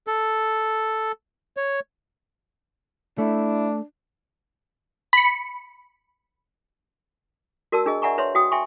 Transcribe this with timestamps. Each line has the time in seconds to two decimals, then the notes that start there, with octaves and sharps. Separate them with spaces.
0.07 A4
1.57 C#5
3.18 A3 D4 E4
5.13 B5 C#7
7.72 F#4 A#4 D5 A5 E6
7.86 D4 G#4 D#5
8.02 D5 E5 F#5 G#5 A#5 C#6
8.18 B4 C#5 E5 C6
8.35 F#4 G5 D#6
8.51 E5 G5 G#5 C6 C#6